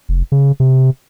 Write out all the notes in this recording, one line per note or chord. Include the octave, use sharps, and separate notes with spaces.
F1
C#3
C3